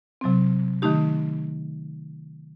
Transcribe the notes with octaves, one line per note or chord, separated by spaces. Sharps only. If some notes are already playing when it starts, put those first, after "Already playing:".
C3 F#3 C4
D#3 A3 D#4 G4